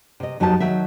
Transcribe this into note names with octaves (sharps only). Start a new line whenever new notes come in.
C3 D#5
F2 F#3 D#4 G4 A5
D#3 F#3 E5